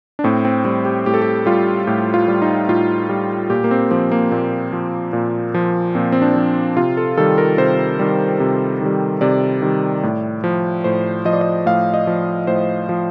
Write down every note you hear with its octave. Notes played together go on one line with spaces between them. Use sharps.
D4
A2 C4
C4
G3 C4
G4
A2 G4
A4
G4
G3 F4
A2 G4
F4
G3
D#4
A2 F4
G3
A#2 G4
A#3
C4
F3 C4
A#3
A#2 C4
F3
A#2
F3
A#2 C4
C4
D4
F3
C3 F4
A4
D#3 G3 A4
A#4
C3 C5
D#3 G3
C3
D#3 G3
C3 D5
D#3 G3
A2
F3
A2 C5
F3 D#5
D5
D#5
A2 F5
D#5
F3
A2 C5
F3